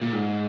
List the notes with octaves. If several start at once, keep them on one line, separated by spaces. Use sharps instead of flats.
A#2
G#2